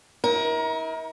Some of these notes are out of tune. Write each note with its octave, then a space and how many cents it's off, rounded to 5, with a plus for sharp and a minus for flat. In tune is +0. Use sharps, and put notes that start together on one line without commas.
E4 -45 A#4 +25